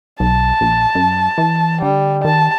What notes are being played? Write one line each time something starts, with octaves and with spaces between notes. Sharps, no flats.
B1 A5
A#1
F#2
E3
D3 G3
D#3 A5